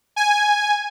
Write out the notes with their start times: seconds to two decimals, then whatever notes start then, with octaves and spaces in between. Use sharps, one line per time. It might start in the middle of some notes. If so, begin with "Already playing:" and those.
0.16 G#5